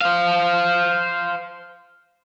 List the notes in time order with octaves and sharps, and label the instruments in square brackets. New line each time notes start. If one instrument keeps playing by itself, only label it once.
[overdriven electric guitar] C5 F5